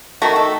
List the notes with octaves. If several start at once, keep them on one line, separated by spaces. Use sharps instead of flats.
D#3 A3 F#4
A4